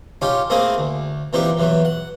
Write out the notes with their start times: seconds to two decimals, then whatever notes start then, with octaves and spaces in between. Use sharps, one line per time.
0.22 C#4 D#4 F4 G4 C#5
0.50 A3 A#3 C4 E4 G#4 D#5
0.78 D2
1.33 A#2 E3 C4 D#4 G4
1.57 E2 E3 F#3
1.85 F#5